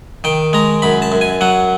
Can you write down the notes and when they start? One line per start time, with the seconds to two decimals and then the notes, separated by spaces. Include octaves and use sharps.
0.24 D#3 G5
0.53 G#3 A#5
0.82 F#2 B5
1.02 A5
1.12 F#2
1.21 G#5
1.41 F#3 F#5